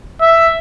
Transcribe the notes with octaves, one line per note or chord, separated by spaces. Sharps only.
E5